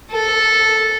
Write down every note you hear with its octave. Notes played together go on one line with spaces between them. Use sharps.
A4